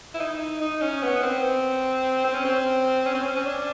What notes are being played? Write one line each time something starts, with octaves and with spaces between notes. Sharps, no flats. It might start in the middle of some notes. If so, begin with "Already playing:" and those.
E4
D#4
D#4
C#4
B3
C4
C4
C#4
C4
C#4
C4
C#4
C#4
D4